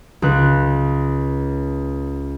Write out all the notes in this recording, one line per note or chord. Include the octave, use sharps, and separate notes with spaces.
C#2 F#6